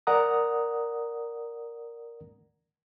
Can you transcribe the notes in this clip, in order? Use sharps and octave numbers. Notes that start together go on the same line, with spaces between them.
A#4 D5 F#5 A#5 D#6